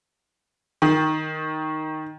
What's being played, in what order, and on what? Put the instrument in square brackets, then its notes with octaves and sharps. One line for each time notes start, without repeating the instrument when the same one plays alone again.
[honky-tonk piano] D#3